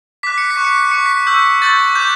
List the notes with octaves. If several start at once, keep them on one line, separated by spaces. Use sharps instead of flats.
D6 F#6 B6
C#7
B6
C#6 F#6
C#7
B6
C#6 F#6 C#7
B6
C#6 E6 G6
C#6 E6 G6 A6
D6 F#6 G6